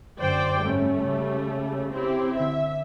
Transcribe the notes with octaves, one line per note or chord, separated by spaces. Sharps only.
F#2 D3 C5 D5 G5
G#2 G3 A3 C#4
C#3
C4 E4 G4
D3 E5